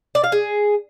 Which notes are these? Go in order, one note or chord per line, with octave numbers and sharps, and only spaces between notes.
D5
F5
G#4